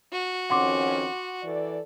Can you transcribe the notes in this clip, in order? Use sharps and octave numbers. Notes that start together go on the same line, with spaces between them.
F#4
F2 D#3 C#4 F#5 C6 D6
E3 A4 D5